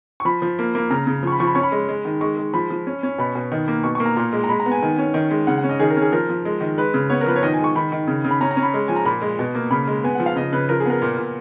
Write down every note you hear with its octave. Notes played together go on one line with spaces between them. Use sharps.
C#6
F3 B5
F3
A#3
A#3
C#3 A#5
C#3
F3 C#6
B5
F3 C#6
B5
C#4 C#6
B5
G#3
G#3
D#3
G#3 C#6
G#3
F3 B5
F3
C#4
C#4
B2 B5
B2
D#3
A#3
B2 C#6
C#6
A#3
A#5
A#2 A#5
G#3
A#5
G#3 B5
A#5
B3
G#5
D#3 G#5
C#4
D#3
G#3
C#3 F#5
F#5
C#4
D#5
D#3 G#4
A#4
C#4 G#4
F3 A#4
F3
G#3
D#3
G#3 B4
C#3
B3 C#5
A#4
F3 B4
C#5
D#3 D#5
G#5
G#3
C#6
D#3 B5
D#3
C#3
C#3
B5
C#4 A#5
A#5
C#4
B5
G#3
F3 G#5
A#5
A#2 B5
G#3
B2
A#3
C#3 B5
G#3
B3 G#5
F3 F#5
F5
C#3 D#5
C#3 B4
F3 A#4
G#4
B3 A#4
A#2
A#2